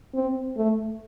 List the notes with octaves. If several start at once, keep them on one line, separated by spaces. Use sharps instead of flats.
C4
A3